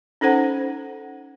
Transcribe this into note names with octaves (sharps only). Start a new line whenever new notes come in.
C#4 D#4 A4 C5 F#5